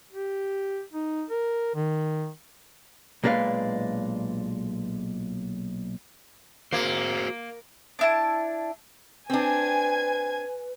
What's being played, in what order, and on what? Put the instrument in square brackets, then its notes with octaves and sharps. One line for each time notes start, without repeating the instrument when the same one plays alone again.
[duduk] G4
D#4
A#4
D#3
[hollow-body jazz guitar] B1 A#2 G#3 D4 B4 F5
[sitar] A#3 [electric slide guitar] F#4 G#4 C5
[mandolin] D4 E4 A5
[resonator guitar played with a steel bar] C4 D4 [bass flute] B4 [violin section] G#5 G#6